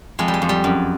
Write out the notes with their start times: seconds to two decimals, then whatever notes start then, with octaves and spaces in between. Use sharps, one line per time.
0.19 F2 G#3
0.28 G3
0.34 G#3
0.42 F2
0.49 G3
0.64 F#2